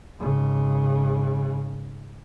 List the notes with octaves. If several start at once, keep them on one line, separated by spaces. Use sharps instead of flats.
G#1 C#3